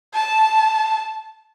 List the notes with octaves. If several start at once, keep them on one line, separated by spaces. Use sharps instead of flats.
A5